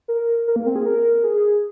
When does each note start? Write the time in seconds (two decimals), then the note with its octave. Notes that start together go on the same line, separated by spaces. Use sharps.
0.08 A#4
0.48 A#4
0.56 A#3
0.66 C4
0.76 G#4
0.86 A#4
1.23 G#4